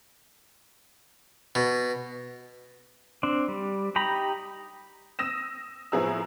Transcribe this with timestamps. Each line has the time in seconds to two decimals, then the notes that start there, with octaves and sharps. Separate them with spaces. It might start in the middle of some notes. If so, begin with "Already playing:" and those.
1.55 B2
3.23 C4 D4
3.48 G3
3.96 D#4 G4 A#5 B5
5.19 D#6 E6 A#6 E7
5.92 A2 F3 B3 G#4 A#5 E6